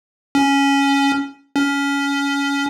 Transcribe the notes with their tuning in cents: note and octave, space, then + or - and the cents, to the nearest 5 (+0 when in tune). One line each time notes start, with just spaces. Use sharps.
C#4 +5
C#4 +20